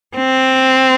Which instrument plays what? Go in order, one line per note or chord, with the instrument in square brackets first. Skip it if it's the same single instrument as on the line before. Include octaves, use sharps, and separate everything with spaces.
[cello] C4